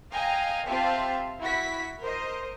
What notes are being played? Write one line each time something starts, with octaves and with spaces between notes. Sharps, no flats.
D#5 F5 G5 G#5 A#5
C4 F4 G4 E5 F5 A5
E4 F#4 B5 B6
A#4 C5 D#5